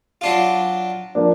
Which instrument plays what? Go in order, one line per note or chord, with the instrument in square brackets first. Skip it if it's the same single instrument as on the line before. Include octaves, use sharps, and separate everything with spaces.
[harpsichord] F#3 D4 F4
[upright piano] F3 A#3 D4